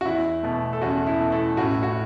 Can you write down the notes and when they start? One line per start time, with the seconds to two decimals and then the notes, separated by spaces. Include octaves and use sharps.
0.01 F#4
0.05 E2 E4
0.43 B2 A3
0.73 A4
0.82 E2 C#4 F#4
1.06 E4
1.19 B2 A3
1.32 E4 A4
1.57 A2 C#4 F#4
1.82 C#4 F#4